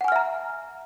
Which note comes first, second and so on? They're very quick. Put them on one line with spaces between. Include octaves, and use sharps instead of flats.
F#5 G#5 F6 E5 A#5